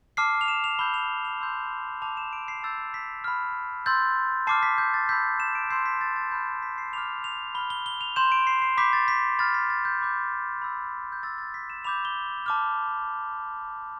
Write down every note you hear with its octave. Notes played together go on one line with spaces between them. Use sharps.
A5 D6 F6 C7
F7
E7
F7
B5 E6 G6 G7
F7
F7
C6 E6 G6
A5 D6 F6 F7
E7
D7
C7
A5 E6 G6 A6
B6
B5 F6
C6 E6 G6 A6
A5 D6 F6 C7
B6
G6
A6
B5 E6 G6 B6
E7
D7
C6 E6 G6 C7
B6
A6
A6
B5 F6 G6
A6
B6
C7
B5 D6 F6 F7
F7
B5 F6 G7
G7
G7
F7
C6 G6 E7
D7
C7
C7
B5 D6 G6 B6
A6
B6
B5 F6 A6
B6
A6
G6
B5 D6 G6
B5 E6 G6
G6
B5 E6 G6 A6
A6
B6
E7
B5 D6 G6 F7
G7
A5 D6 F6